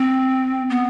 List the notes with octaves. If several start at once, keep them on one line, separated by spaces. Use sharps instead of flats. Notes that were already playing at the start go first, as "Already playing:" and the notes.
Already playing: C4
B3